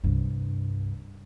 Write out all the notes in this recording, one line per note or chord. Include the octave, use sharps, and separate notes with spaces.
C2 G2